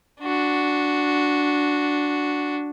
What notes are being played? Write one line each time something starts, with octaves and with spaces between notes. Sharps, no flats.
D4 F#4